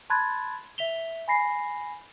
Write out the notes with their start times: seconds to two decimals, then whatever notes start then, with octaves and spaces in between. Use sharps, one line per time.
0.10 A5 B5 C6 F#6 G#6 A6
0.78 E5 B6 F7 G7
1.28 G#5 B5 A#6 C7